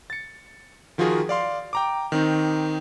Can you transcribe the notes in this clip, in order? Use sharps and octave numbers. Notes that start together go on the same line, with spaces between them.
A6 C#7
D#3 F3 F4 F#4 G#4 A#4
D5 F5 C6
G5 A#5 D6
D#3 C4 D#4